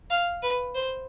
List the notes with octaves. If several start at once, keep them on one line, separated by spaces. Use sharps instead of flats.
F5
B4
C5